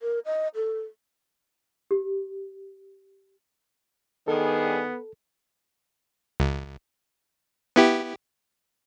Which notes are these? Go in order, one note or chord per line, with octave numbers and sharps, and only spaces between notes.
A#4
D#5
A4
G4
G2 D#3 B3 G#4 A4
C#2
B3 E4 G4